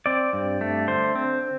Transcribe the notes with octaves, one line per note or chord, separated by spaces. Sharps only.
C4 D5
G2
A3
D3 C5
C4